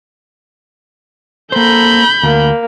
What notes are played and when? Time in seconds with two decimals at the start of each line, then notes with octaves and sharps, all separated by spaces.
1.52 A#3 A4 C5 A#5 B5 G6
2.23 D2 A#3